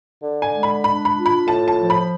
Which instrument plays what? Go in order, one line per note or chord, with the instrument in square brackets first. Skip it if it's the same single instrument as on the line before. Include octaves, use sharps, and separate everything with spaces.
[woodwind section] D3
[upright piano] G#5
[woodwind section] G#3
[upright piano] B5
[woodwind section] D4 [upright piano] B5
[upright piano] B5
[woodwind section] F4
[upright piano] B5
[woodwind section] A2 [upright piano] A5
[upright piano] A5
[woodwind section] F3
[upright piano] B5